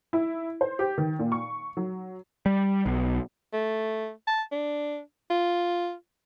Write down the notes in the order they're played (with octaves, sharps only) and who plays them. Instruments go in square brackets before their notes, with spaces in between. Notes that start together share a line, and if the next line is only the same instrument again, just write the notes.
[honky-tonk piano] E4
C5
G4
D#3
A#2
C#6
F#3
[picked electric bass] G3
B1
[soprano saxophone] A3
A5
D4
F4